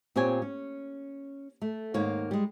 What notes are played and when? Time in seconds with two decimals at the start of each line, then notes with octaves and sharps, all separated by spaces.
0.16 A#2 C4 G4 C#5 G#5
0.42 C#4
1.62 A3
1.94 D#2 G#2 A#3 C#5
2.31 G3 G#3